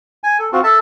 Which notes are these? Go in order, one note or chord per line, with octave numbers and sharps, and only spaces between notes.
G#5
A4
C4 F4 F#4
A4 E5 A5